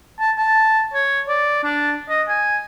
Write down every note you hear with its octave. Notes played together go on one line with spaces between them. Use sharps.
A5
A5
C#5
D5
D4
D#5
G#5